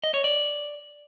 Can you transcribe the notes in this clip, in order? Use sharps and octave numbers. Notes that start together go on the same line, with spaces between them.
D#5
C#5
D5